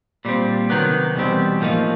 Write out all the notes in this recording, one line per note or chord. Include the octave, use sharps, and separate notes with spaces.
A#2 G3 C4
C3 D#3 F#3 B3
E2 B2 G3 C4
A2 F3 A#3 D#4